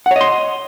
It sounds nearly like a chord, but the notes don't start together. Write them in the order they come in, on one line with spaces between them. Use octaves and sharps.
F#5 C#5 D#5 C6